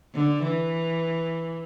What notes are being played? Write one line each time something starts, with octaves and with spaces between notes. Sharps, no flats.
D3
E3